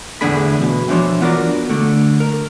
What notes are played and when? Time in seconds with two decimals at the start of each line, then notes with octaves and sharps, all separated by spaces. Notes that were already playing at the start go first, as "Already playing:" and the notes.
0.21 E2 A2 D3 D4 G#4 B5
0.61 B2
0.88 E3 F3 D4 C5 C#5
1.21 B3 D4 F4 F#4 A#4 D5
1.69 D3 A3
2.20 A#4